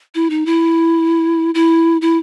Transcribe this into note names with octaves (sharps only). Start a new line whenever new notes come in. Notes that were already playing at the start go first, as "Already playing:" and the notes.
E4
D#4
E4
E4
E4